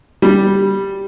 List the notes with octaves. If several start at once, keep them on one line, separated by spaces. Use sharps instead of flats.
G3